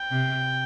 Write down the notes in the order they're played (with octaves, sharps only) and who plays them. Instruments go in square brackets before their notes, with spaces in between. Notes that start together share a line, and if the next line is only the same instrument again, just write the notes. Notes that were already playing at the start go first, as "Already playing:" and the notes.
Already playing: [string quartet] G5
[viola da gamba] C3